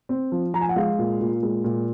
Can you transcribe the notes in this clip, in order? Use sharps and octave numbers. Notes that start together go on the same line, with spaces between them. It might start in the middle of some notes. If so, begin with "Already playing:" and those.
C4
F3
F3 A#5
G#5
F#5
G#3 F5
A#2
A#2
G#3
A#2